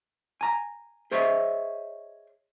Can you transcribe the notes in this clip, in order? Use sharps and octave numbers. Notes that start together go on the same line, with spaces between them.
G#5 A#5
G#4 C5 C#5 D#5 E5